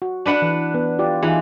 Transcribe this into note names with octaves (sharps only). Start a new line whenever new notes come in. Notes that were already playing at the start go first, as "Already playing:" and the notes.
F#4
D4 B4 F#5
E3
B3
F4 G4 D5
E3 D#4 F4 G#4